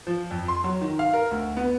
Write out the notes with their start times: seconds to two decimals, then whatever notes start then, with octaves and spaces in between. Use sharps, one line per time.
0.07 F3
0.31 F2
0.48 C6
0.64 F#3
0.81 D#3
0.99 F5
1.13 A#4
1.31 D2
1.57 B3